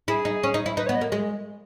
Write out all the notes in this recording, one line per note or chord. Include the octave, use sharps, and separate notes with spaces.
E4 G#4
D#4
C#4
D#4
E4
D#4 B4
C#5
B3
D#5
A#3
G#3